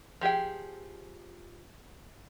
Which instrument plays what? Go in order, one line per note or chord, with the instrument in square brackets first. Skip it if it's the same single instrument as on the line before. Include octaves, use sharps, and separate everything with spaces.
[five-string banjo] F3 G4 G#4 G5